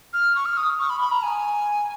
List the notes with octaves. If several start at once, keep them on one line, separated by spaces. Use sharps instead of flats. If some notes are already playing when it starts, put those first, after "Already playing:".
F6
C#6
F6
D#6
C#6
B5
B5
A#5
G#5